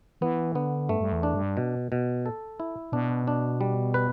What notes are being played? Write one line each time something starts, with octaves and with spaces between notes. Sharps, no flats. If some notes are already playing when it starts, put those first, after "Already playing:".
E3 B3
D3 B3
G2 A3
G2
E2
D4
G2
B2
B2
A4
E4
B2 D4
D4
G3
B4